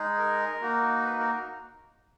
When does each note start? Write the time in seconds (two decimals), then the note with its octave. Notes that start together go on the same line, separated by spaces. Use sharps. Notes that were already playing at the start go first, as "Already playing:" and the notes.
Already playing: G#3 D#4 G#4
0.18 A#4
0.62 A#3 D#4 F#4
1.05 B4
1.19 A#4